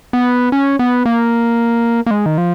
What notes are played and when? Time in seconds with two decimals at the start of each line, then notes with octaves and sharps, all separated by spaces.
0.13 B3
0.52 C#4
0.79 B3
1.06 A#3
2.06 A#3
2.11 G#3
2.26 D#3
2.38 F3